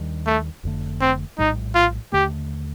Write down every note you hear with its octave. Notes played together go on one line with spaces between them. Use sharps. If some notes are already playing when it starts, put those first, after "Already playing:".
Already playing: D#2 D#3 G3 D4
A3
F1 F2 D3 A3
C4
A#1 A2 G3 D#4
F4
D#2 D3 A3 G4